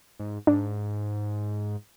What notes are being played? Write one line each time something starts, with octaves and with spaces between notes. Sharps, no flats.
G#2
G#2 D4